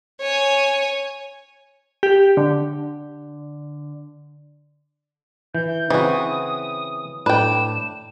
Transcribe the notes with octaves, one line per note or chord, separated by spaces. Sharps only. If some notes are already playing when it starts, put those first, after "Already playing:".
C#5 G#5
G4
D3
E3 G6
C#3 E3 C4 F#4 D#6
A2 D4 B4 G5 E7